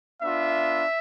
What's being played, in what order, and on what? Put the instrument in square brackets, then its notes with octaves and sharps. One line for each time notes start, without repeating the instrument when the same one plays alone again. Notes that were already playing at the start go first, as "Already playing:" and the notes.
[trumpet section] B3 D4 F4 E5